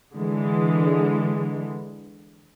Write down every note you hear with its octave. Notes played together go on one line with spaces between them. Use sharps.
D3 E3 G#3